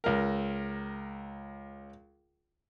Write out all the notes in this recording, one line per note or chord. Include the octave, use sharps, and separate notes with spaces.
C#2 A#4